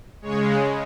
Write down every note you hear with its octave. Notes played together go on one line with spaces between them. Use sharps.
C#3 G#3 C#5